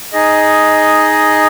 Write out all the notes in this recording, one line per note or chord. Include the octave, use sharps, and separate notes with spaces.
D#4 G#4 D#5